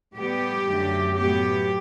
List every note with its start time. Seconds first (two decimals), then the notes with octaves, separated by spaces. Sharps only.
0.16 A2 G3 B3 G4
0.66 F#2 D3 F#3 A3
1.17 A2 F#3 B3 G4